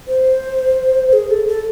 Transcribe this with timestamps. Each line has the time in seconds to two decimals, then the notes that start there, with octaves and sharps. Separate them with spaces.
0.08 C5
1.13 G#4
1.31 A4
1.48 A4